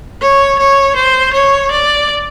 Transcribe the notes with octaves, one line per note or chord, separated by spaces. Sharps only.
C#5
C#5
C5
C#5
D5